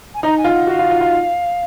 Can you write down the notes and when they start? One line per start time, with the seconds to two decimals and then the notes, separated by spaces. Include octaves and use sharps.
0.14 G#5
0.23 D#4 A#5
0.37 G#5
0.44 F4
0.53 F#5
0.67 F#4 F5
0.79 F4
0.91 F4
1.01 F4